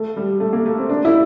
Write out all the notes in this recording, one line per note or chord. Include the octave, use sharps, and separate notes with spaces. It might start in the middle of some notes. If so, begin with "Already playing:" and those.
Already playing: A3
G3
A3
A#3
A3
C4
D4
E4